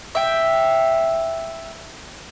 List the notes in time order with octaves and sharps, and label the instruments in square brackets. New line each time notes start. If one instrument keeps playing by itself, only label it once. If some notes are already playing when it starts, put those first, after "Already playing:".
[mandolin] E5 G5